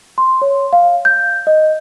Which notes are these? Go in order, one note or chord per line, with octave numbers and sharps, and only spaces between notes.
C6
C#5
F5
G6
D#5